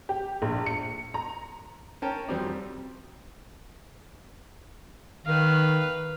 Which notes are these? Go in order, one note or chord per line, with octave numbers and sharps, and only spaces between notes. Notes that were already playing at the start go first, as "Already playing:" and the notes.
G4
A#1
C#7
A#5
C#4 A#4 G5 A5 A#5
F2 F#3 G3 C4 D5 A#5
D#3 B4 F5